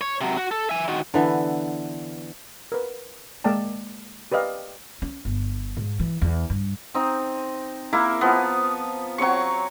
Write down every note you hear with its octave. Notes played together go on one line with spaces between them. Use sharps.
C#5
C3 F#3
F#4
A4
E5 G#5
D#3 F#4
D3 E3 B3
A#4 B4
G#3 A#3 D5 G5 A5
G4 B4 D5 D#5 F5
C#4
G1
G#2
E3
E2
G2
C4 D#4
A#3 E4 A#4
F3 B3
F#3 C4 C#5 C#6